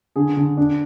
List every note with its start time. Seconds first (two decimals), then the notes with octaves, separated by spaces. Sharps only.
0.16 D3 G#4
0.37 D3
0.57 D4